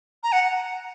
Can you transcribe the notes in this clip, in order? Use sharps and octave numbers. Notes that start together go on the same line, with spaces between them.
A#5
F#5